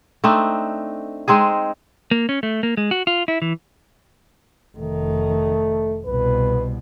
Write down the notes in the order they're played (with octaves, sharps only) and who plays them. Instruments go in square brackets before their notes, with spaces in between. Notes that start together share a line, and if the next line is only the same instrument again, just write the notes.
[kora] A3 C4 D4 D#4
G#3 C4 D#4 G#4
[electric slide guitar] A#3
C#4
A3
A#3
G#3
F#4
F4
E4
E3
[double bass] F1 D#3 [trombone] A3
[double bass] C2 B2 [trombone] B4